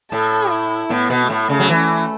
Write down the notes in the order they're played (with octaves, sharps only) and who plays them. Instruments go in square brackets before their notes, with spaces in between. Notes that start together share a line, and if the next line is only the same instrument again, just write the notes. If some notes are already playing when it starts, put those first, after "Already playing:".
[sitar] A2 [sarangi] A4
[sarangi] E4
[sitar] A2 [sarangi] B3
[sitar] B2
[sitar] A2 [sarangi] A3
[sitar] C#3
F#3
E3